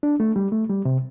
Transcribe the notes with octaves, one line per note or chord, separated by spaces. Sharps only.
D4
A3
G3
A3
G3
C3